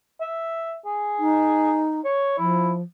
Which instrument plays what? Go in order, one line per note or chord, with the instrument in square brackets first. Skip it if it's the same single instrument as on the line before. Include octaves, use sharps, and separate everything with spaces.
[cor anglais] E5
G#4
[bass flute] D#4
[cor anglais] C#5
[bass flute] F3 [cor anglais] E4